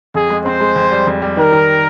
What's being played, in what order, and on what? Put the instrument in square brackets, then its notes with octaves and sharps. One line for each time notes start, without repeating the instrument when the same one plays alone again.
[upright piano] F2 [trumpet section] G#4
[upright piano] G#3
[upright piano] C4 [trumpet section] C5
[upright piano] G#3
F2
G3
F2
G3
[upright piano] D#3 [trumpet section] A#4
[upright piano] D#3